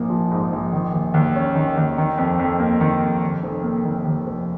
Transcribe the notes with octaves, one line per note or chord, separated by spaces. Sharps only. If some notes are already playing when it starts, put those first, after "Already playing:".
Already playing: A#1 G#2 A#3
F3
G#2
A#1
D#3
D#2
D#2
C#4
D#3
D#2
D#3
F2
F2
A#3
D#3
F2
D#2
F1
A#3
D#3
D#2
F1